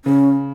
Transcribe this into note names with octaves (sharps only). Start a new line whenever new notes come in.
C#3 C#4